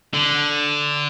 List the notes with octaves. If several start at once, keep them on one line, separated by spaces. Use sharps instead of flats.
D3